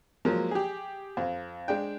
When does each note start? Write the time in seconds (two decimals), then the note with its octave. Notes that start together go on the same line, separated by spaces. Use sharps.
0.25 F3 F#3 G#3 A#3
0.51 G4 G#4
1.17 F2
1.68 G#3 D4 G5